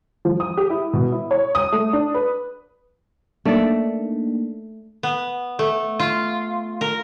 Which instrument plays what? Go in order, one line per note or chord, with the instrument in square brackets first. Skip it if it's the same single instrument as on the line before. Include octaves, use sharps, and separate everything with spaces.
[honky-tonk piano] F3
D#6
G4
E4
B2
E4
C#5
D#6
A3
D4
B4
[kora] A3 D5 [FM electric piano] A#3 D4 D#4
[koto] B3
A3
F4
A#4